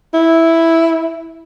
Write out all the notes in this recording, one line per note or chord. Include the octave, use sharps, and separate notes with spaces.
E4